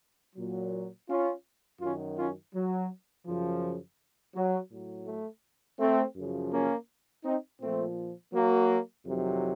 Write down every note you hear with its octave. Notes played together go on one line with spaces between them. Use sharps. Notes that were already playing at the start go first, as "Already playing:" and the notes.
A#2 F#3
C#4 F4
F#2 D#3 F#3 C#4 F4
C#4 F4
F#3
F#2 C#3 F3
F#3
A2 F#3
A3
A3 C4
F#2 C#3 F3
A#3 C#4
C4 D#4
A#2 F3 A3 C4
F#3 A#3
F2 C3 D#3 F#3